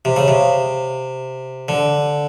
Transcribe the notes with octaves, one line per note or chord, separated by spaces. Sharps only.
C3
C#3
C3
D3